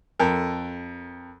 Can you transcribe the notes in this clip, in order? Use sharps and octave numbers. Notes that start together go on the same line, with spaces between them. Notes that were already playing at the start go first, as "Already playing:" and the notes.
F2 A4 A#4